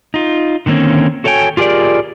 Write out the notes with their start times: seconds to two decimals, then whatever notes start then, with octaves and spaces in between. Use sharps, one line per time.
0.14 D#4 F4
0.66 D3 D#3 A#3 C4 C#4
1.24 F#4 A4 C#5 E5 G5 G#5
1.57 F4 G4 G#4 A#4 D5